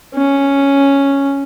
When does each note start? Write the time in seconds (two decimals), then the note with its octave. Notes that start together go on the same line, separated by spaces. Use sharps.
0.15 C#4